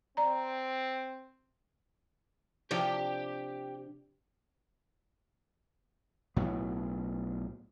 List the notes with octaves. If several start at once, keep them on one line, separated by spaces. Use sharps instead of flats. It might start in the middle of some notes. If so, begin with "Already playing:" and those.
C4 D5 A#5
C3 F3 D4 G4 G5
B1 A2 B3